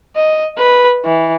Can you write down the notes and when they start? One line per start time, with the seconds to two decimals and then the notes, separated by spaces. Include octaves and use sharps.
0.16 D#5
0.58 B4
1.05 E3